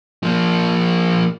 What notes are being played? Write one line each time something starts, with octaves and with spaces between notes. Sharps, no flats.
F3 A#3